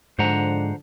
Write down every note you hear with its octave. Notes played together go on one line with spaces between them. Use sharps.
G#2 D3 F3 G#3 D4 C5 F#5 A#5